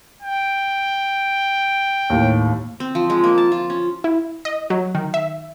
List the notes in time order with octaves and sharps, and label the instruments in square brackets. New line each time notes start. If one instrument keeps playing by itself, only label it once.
[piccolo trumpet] G5
[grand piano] D#2 A2
[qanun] C4
F3
G#3
A#3
A5
F4
C#4
[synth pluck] E4
D#5
F#3
D#3
E5